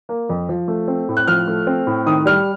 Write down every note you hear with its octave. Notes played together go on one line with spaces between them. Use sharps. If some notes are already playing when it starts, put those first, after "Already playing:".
A#3
F2
F3
A3
C4
A2
F#6
F3 F6
A3
C4
A2
D#3 D#6
G3 F6